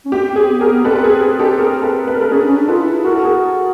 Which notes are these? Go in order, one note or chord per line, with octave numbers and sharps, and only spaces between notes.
C#4
C4 G4
C4
G#4
B3
G#4 A#4
B3
C4 A4 B4
B4
G#4 A#4
G#4
G4 A4
G#4 A#4
A4 B4
B4
A#4
A4 B4
C#4 G#4 A#4
D4
C#4
D4
F4 A4 B4
E4
F#4 A#4
A4
G#4 A#4